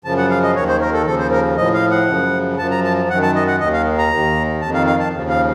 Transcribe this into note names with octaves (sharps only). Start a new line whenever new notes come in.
F#2 C#3 F3 A5
F#5
F5
D#5
D#2 D#3 C#5
C5
A#4
A4
D#2 C#3 F3 A4
C5
A#4
A2 F3 D#5
F5
F#5
F#2 C#3 F3
F#2 F3 A5
A#5
A5
F#2 D#3 F#5
A5
D#5
F#5
D#2 D#3 D#5
F5
A#5
D#2 D#3
F2 D#3 A5
F5
F5
A5
D#2 C#3 F3
F5